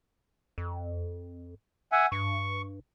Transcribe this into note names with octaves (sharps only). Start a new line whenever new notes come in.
F2
E5 F#5 G#5
G2 C#6